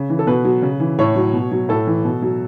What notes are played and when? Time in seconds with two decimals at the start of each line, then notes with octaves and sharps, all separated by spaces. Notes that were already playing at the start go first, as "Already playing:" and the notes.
Already playing: C#3
0.10 E3
0.19 A4
0.27 B2 B4
0.45 F#3
0.62 C#3
0.80 E3
0.99 A2 C#5
1.16 F#3
1.33 B2
1.51 F#3
1.69 A2 A4
1.87 E3
2.05 B2
2.22 F#3